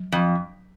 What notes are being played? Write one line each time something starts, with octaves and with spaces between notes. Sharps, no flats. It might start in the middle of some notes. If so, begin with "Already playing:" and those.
Already playing: F#3
F2